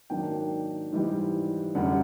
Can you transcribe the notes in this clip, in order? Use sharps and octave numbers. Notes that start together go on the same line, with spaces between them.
G#2 D#3 F#3 A#3 D4 G5
G#2 E3 G3
F#2 D3 G3 F#5